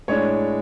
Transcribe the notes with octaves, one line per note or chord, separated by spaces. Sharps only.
A2 G#3 D4 C#5